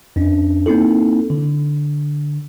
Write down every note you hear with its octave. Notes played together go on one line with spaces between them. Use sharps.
F2 C#4 D4
A#3 C4 D#4 E4 A4
D3